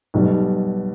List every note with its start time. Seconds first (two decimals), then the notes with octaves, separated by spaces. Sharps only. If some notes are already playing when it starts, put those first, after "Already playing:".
0.14 B1 B2 G3